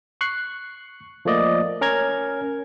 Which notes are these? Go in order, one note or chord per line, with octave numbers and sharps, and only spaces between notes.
C#6 F#6 C7
F3 A3 A#3 D5 D#5
C#4 A#4 A#5 G#6